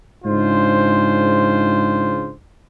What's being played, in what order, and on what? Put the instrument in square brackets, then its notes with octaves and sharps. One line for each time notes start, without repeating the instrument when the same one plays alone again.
[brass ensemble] G#2 C#3 D4 F4 C5